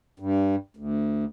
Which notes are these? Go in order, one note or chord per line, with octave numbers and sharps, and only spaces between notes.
G2
D2